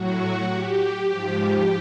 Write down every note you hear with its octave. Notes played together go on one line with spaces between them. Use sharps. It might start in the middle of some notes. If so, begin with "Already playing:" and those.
Already playing: A2 F#3 F#4
G4
G#2 F3